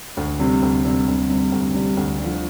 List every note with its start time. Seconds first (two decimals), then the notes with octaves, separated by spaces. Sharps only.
0.17 D2
0.39 C3 G3
0.62 D2
0.85 C3 G3
1.07 D2
1.29 C3 G3
1.52 D2
1.74 C3 G3
1.97 D2
2.19 D3 F3